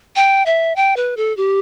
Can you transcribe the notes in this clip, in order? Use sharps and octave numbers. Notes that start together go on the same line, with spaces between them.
G5
E5
G5
B4
A4
G4